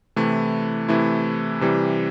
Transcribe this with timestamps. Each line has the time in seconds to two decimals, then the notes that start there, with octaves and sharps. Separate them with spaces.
0.16 C3 E3 A3 E4
0.89 C3 E3 A3 E4
1.61 C3 E3 G3